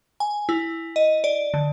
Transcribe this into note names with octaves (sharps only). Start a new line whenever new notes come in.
G#5
E4
D#5
D5
D3